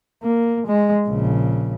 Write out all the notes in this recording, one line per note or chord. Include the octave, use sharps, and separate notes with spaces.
A#3
G#3
A#1 C#3